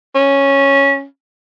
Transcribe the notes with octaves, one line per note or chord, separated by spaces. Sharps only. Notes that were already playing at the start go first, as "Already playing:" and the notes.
C#4